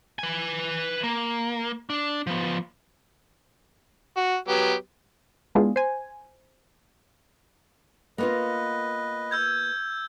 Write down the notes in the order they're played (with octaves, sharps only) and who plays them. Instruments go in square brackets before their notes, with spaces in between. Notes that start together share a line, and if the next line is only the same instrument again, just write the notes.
[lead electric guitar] B4 G#5
A#3
D4
F3 B3
[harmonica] F#4
F#3 B3 G4
[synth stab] G#3 B3 D4 E4 F4 G#4
C5 G#5
[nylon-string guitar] A#3 B3 F4 [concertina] B4 D#5
[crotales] E6 G6 G#6